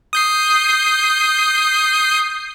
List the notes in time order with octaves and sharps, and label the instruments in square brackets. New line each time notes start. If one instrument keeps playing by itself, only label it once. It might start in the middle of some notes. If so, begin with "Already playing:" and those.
[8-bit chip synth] D#6 G6 C7